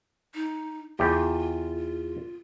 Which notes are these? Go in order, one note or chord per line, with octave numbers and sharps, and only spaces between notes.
D#4
E2 F4 G4